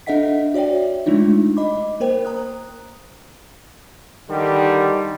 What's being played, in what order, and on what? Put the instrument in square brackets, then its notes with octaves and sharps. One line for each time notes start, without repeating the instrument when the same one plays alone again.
[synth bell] D4 A4 D#5 E5 F#5 B6
F#4 C#5 D5 E5 G5
G#3 A3 D4 D#4 F4
D#5 B5 D6
A#3 A#4 C5 G5
A#5 D#6 F#6
[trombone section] D3 D#3 G3